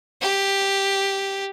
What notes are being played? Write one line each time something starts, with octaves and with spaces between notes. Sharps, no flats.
G4